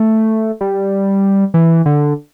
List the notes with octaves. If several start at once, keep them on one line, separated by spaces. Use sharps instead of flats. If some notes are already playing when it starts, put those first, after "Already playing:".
Already playing: A3
G3
E3
D3